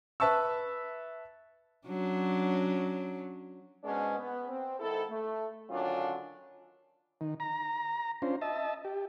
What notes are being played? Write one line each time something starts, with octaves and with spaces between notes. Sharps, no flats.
B4 E5 A5 C#6 E6
F#3 C#4 D4
G#2 B2 G#3 B3 C#4 D4
B3
C4
G#2 D#3 E4 A4
A3
D3 D#3 F#3 C#4 D4 F4
D#3
A#5
C#4 D4 F4 C5
D#5 E5 A5
G4